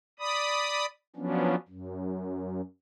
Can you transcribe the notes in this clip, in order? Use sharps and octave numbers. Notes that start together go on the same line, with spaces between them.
D5 B5 D#6
F3 F#3 B3 C#4 D4
F#2